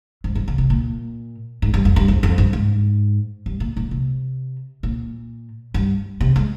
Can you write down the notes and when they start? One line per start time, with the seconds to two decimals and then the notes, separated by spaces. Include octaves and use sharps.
0.24 G#2
0.35 G2
0.48 C#3
0.58 C3
0.70 A#2
1.62 G#2
1.74 G2
1.85 F2
1.96 G2
2.08 F2
2.23 F2
2.38 G2
2.53 G#2
3.46 G2
3.60 A#2
3.77 A#2
3.91 C3
4.83 A#2
5.74 G2
6.21 C3
6.36 G#3